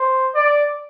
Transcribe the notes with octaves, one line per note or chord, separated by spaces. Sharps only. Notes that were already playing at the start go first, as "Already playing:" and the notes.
Already playing: C5
D5